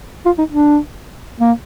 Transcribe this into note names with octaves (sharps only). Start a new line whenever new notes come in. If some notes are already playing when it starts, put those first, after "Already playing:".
F4
D#4
D4
A#3